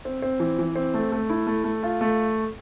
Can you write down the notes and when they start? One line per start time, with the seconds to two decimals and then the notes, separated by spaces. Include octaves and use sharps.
0.05 C4
0.22 C4
0.40 E3
0.59 E3
0.76 C4
0.94 A3
1.12 A3
1.29 E4
1.47 A3
1.64 A3
1.83 F4
2.01 A3